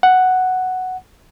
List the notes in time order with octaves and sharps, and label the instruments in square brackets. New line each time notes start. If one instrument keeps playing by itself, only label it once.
[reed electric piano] F#5